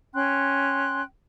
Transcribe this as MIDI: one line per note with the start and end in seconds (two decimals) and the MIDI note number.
0.14 1.01 61
0.14 1.01 79
0.14 1.01 84
0.14 1.01 90